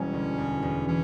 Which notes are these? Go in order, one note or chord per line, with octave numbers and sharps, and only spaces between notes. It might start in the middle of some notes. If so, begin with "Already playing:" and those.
Already playing: E1 B2 G3 A#3 C#4
D2
E2
E2
E3 C#4